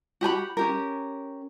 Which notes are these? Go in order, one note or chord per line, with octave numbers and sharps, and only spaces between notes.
F#4 G4 G#5 B5
C#4 G4 A#4